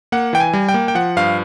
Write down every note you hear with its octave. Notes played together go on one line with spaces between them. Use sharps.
A#3 F#5
E3 G5
G#5
G3
G5
A#3
G5
F3 F#5
G2 F5